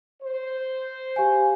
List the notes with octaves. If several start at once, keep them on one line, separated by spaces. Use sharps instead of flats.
C5
G4 F5 G#5